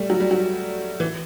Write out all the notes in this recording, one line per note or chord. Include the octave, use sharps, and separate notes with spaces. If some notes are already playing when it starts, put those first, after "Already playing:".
Already playing: G3 A3
F#3
G3
F#3
E3